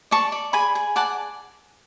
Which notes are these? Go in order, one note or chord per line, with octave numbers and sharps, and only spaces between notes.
D5 A5 C#6
D5
G#4 G#5 B5
G#4
D5 F#5 A5